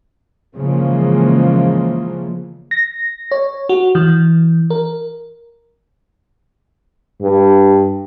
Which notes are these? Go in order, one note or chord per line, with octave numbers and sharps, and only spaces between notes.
C#3 E3 F3 G#3 A#3
A#6
C#5
F#4
E3
A#4
G2